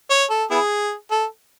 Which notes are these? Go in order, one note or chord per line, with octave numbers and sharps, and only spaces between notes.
C#5
A4
B3 E4 G#4
A4